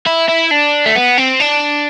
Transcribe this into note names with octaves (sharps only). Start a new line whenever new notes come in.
E4
E4
D4
A3
B3
C4
D4